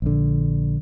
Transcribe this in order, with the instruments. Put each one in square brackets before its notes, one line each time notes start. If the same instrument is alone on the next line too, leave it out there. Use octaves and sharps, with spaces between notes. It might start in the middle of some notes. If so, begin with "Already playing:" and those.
[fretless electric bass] A#1 D3